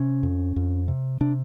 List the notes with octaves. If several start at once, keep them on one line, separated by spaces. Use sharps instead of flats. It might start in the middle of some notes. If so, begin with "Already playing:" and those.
Already playing: C3 C#4
F2
F2
C3
C3 D4